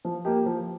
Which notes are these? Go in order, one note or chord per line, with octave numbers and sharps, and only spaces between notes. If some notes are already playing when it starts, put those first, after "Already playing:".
F3
A#3 G4
F3